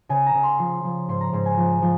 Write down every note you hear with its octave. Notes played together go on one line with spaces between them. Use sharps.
C#3 G#5
A#5
C#3
C6
F3
F3
G#2 C6
A#5
G#2 C6
G#5
F3
F3